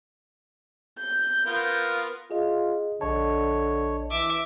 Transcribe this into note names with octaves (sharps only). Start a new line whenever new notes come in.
G6
B3 F4 A#4
F4 G#4 D#5
A#1 D3 C#5 D#5 A5
E3 E5 D6